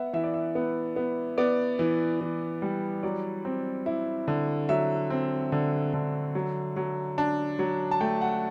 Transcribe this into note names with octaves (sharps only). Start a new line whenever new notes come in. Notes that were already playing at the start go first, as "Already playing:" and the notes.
Already playing: B3 E5 F#5
E3 E5
D5
E5
B3
B3
B3 D5
E3
E3
G3
F#3 D5
C4
E4
D3
F#3 E5
C4
D3
D3
F#3
F#3
D4
F#3
A5
A3 G5
F#5